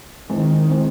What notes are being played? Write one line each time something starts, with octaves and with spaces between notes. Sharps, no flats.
D#3 E3 G#3 C4
E3 G#3 C4